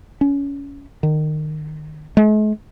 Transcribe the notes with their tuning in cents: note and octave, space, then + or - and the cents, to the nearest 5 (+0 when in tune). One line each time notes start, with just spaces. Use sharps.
C#4 +25
D#3 -25
G#3 +45